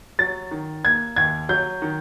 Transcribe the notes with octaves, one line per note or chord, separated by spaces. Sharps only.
F#3 A6
D#3
A#3 G#6
D#2 G#6
F#3 G6
D#3